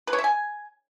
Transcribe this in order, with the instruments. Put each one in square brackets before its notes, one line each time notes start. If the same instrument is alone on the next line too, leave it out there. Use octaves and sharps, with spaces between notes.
[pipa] B4
C#5
E5
G#5